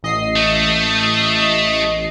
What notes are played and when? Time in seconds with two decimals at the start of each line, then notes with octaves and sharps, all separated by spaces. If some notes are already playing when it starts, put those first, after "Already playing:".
0.03 A1 D#5 C7
0.36 A3